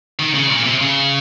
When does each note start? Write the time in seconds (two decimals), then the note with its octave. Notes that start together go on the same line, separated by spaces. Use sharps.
0.19 D#3
0.35 C#3
0.50 A#2
0.65 C3
0.80 C#3